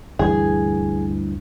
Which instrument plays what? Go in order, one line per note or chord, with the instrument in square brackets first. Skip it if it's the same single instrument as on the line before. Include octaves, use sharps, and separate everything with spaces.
[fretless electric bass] D2 G2 E3 [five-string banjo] G#4